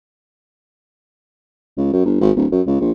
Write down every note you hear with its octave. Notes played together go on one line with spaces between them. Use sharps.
C#2
F#2
G1
G#1
D1
F#2
C#2
A#1